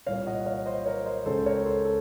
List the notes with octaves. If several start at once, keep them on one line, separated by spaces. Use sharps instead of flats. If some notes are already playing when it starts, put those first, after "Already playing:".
C2 A#2 C#5 F5
D#5 F#5
C#5 F5
C5 D#5
A#4 C#5
C5 D#5
C#2 C#3 A4 C5
A#4 C#5
A4 C5
A4